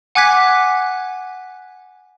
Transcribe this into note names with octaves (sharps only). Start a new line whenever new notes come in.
F#5 G#5 D6 F#6 G#6 B6